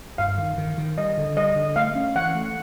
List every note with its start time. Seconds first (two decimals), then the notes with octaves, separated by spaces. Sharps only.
0.18 G2 F5
0.38 D#3
0.58 D#3
0.78 D#3
0.98 G3 D#5
1.18 D3
1.36 G3 D#5
1.56 D3
1.76 A3 F5
1.95 C#4
2.15 E3 F#5
2.35 A3